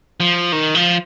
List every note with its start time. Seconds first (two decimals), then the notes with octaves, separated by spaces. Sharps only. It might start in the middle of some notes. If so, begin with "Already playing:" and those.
0.20 F3
0.52 D#3
0.75 F3